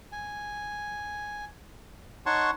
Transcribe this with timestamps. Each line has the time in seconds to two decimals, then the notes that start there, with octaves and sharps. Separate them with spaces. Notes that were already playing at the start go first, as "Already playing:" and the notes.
0.12 G#5
2.26 D#4 C#5 F#5 A5 C6 C#6